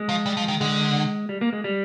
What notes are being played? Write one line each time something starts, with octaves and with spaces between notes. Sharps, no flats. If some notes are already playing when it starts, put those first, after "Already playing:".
Already playing: G#3
F3
G3
F3
D#3
D3 G#3
G3
A#3
G#3
G3